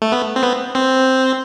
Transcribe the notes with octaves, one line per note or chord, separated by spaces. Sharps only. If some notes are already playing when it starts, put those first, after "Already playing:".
A3
B3
C4
B3
C4